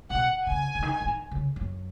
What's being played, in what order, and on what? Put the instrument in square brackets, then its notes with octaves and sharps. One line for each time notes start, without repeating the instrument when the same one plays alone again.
[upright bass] B2 [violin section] F#5
[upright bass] C#3 [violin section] G#5
[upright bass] C#3
D#3
E3
D#3
C#3
F#2